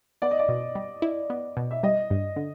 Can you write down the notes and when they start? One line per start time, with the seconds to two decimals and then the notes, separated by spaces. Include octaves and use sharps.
0.22 B3 D5
0.31 D#5
0.39 D5
0.49 B2
0.75 G3
1.02 E4
1.30 B3
1.57 B2
1.71 E5
1.83 G3 D#5
2.10 G2
2.36 D3